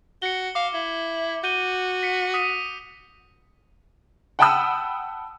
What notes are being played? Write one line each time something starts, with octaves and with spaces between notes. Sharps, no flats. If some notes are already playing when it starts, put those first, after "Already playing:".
F#4 C#7 G7
F5 D6
E4
F#4 G6 D#7 G7
B6 C#7
D#6 B6 D#7
F#5 G5 A5 B5 D#6 E6